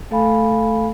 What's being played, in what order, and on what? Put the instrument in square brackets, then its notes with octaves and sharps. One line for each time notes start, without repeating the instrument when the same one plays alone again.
[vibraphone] A3 A4 F5 G#5 B5